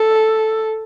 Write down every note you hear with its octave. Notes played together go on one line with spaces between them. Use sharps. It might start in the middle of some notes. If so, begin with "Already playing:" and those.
Already playing: A4